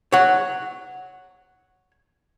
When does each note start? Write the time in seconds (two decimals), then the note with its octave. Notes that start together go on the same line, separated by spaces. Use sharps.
0.12 C#5 F#5